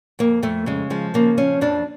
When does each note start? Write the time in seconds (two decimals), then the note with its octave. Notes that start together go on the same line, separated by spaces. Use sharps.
0.19 F2 A#3
0.42 F2 A3
0.66 C#3 G#3
0.90 F3 G#3
1.14 C#3 A#3
1.37 F3 C#4
1.61 F2 D4